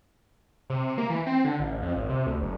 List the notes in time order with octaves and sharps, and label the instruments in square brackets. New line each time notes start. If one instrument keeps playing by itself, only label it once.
[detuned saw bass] C3
A#3
E3
C4
D3
A1
F2
G#1
C3
D2
F#1